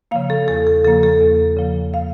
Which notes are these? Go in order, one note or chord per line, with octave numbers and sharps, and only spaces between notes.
C#3 F3 A#3 F5
A4
E2 A4
A4
C#3 F3 A#3 A4
A4
E2
C#3 F3 A#3
F5